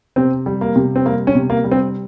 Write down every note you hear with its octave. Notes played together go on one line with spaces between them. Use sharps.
C3 C4
G3
A#3
C3
C4
G3 A#3
C#4
C3
A#3
G3
C4